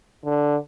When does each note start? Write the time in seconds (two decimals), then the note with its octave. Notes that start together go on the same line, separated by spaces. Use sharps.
0.25 D3